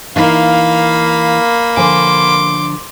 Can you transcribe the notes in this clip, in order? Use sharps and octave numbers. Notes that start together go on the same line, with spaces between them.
E3 A#3 D#4 F5 B5
D3 F3 G#5 C6 D6